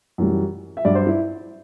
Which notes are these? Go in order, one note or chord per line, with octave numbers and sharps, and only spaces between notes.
F#2 E3 G3
E5
G2 F#3 D5
C5
E4